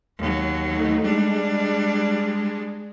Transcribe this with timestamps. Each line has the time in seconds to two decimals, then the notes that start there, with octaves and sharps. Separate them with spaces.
0.18 D#2 F#3
0.69 A3 D#4
1.02 G3 G#3 D4